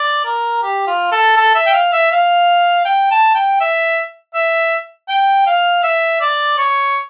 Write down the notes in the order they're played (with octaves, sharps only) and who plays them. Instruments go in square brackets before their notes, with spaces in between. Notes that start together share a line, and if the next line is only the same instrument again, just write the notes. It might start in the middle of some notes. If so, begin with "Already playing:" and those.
Already playing: [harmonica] D5
A#4
G4
F4
A4
A4
E5
G5
F5
E5
F5
G5
A5
G5
E5
E5
G5
F5
E5
D5
C#5